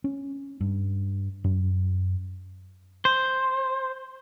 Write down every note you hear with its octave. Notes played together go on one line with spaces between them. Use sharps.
C#4
G2
F#2
C5